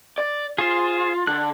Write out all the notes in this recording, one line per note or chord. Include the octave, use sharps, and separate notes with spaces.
D5
F4 G#4 C5
D3 F#6